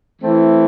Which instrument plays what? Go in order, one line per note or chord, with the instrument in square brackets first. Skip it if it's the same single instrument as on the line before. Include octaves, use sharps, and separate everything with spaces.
[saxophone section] E3 A3 C4 E4